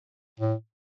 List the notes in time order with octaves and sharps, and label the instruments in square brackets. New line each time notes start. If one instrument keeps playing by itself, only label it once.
[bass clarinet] A2